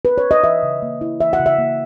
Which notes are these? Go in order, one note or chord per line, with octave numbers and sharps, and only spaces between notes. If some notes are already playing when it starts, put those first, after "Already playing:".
B4
C#5
D#5
E3 E5
C#3
A#3
E4
E3 E5
F#5
C#3
E5
A#3